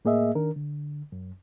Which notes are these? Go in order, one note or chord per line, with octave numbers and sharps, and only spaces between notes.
A2 A#3 G#4 D#5 E5
D#3 D4 A#4
D3
F#2